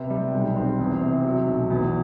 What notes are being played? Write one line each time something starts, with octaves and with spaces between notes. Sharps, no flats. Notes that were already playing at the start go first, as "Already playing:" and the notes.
Already playing: C3 B3
G3
B1
C4
E2
C3
F#3
B1
E2